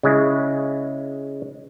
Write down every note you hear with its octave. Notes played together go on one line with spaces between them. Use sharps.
C#3 G#3 E4